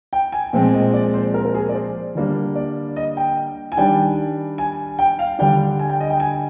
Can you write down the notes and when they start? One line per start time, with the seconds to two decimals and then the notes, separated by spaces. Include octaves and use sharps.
0.13 G5
0.32 G#5
0.53 A#2 F3 G#3 C4 G5
0.74 D#5
0.94 D5
1.14 C5
1.34 A#4
1.45 A#4
1.55 G#4
1.69 D5
1.75 C5
2.15 D3 G3 A#3 D4
2.55 D5
2.96 D#5
3.17 G5
3.72 G#5
3.77 D#3 G3 D4 G5
4.58 G#5
4.99 G5
5.19 F5
5.39 D3 G3 D4 G5
5.79 G#5
5.90 G5
6.00 D#5
6.10 G5
6.20 G#5